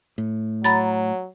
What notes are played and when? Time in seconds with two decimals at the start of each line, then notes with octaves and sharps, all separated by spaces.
0.18 A2
0.64 F#3 A#5 B5 A6